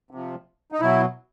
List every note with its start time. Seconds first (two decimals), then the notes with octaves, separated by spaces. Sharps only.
0.11 C3 F3
0.72 D#4
0.81 B2 F#3 E4